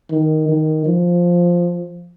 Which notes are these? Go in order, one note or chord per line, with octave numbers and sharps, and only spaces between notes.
D#3
D#3
F3